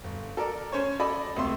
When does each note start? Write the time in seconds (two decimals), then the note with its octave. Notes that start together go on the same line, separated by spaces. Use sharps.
0.04 G1
0.37 A4 A#4 D5
0.72 C#4 C5 C#5
1.00 A4 D5 D#5 B5
1.36 C#2 C3 A3 C6 E6